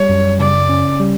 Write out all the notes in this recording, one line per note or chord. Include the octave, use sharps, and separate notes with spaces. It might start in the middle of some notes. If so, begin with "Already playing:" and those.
Already playing: G3 C#5
F#2
C#3 D5
C#4
G3